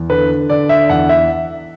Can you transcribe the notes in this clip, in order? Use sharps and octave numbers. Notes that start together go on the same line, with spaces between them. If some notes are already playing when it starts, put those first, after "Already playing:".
Already playing: E2
D3 B4
D3 D5
E5
E2 F#5
E5